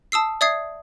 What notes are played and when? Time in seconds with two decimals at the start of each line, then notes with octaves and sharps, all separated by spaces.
0.12 A5 D#6 E6 C7
0.41 D5 E5 D#6 G#6 C7